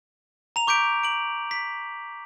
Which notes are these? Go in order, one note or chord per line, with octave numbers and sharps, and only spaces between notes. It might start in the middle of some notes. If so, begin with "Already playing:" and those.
A#5 F7
C#6 D6 G6 B6 D7
D7 F#7
B6